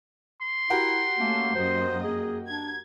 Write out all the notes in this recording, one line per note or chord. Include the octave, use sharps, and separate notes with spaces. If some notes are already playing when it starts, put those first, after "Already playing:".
C6
E4 F#4 G4 A#4
A3 A#3 C#4 A4
F#2 A#3 C5 D#5
G#4
D4 G#6